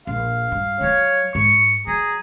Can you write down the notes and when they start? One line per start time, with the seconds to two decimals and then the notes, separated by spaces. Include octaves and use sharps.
0.07 A#1 F5
0.52 G2
0.81 F#3 F4 C#5
1.35 G#2 C#6
1.87 F#3 G#4 A#5